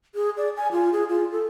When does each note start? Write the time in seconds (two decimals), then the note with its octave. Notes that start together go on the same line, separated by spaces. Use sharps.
0.15 G#4
0.37 D5
0.57 G#5
0.72 F4
0.93 G#4
1.09 F4
1.32 A4